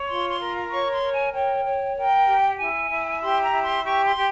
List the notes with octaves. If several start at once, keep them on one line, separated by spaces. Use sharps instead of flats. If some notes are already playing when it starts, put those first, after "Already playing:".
Already playing: C#5
F4 C6
C6
A#4
C#5 C#6
C6
A#4
G#5
C#5 G5
C#5
A#4 G5
G4
E4 G#5
E4
G4 C6
A#5
E4
C6
G4 C#6
C6
G4